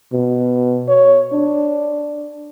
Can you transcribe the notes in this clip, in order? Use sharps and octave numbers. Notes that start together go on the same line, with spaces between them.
B2
C#5
D4